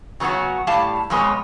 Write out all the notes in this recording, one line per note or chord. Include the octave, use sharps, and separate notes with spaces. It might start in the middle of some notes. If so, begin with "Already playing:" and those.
C#3 F#3 B3 C#4 F#4
A2 G3 G4 F5 A5
F2 B2 G#3 B4 C#5